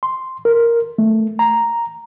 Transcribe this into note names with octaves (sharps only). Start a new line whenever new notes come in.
C6
A#4
A3
A#5